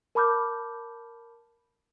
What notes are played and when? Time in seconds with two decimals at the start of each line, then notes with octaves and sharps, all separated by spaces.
0.15 A#4 A5 B5 D6 F6 G6